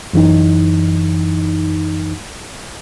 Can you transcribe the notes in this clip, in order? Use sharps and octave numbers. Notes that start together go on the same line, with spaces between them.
F#2 E3 D#4